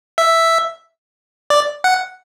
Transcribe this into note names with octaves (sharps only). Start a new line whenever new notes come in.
E5
D5
F#5